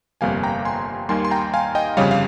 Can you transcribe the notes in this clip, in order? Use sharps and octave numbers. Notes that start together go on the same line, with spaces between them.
G1 F2 C3 G3 A#3 F5 G#5
G5 A#5
G#5 C6
D#2 D#3 G3 A#3 G#5 C6
C6
G5 A#5
F5 G#5
D#5 G5
G1 F2 C#3 G3 C#5 F5
F5